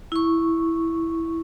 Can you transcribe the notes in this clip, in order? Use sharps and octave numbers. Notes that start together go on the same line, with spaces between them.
E4 C#6